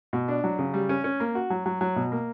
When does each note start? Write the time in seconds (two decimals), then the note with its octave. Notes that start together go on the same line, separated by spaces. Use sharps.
0.13 B2
0.28 D4
0.44 F#3
0.59 C#3
0.74 G3
0.89 C#4
1.04 C#4
1.20 A#3
1.35 F#4
1.50 F#3
1.66 F#3
1.81 F#3
1.96 B2
2.12 A#3